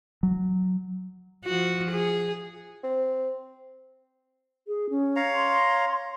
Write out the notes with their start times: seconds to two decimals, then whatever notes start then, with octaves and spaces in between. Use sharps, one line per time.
0.23 F#3
1.45 F3 F#4
1.91 G#4
2.84 C4
4.68 G#4
4.90 C#4
5.16 C#5 F5 A#5
5.34 C6